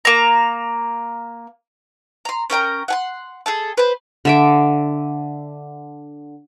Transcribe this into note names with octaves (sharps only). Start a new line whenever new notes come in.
A#3 A#5
A#5 C6
C#4 A#4 G5 A#5
F#5 G#5 C6
G#4 A4 A5
B4 C5
D3 E5 D6